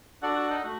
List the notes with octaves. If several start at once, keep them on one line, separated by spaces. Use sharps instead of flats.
D4 F#4 A4 D5 F#5
F#4
D#4
A3 F#4